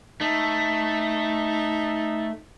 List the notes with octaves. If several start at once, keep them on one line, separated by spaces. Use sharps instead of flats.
A3 D#4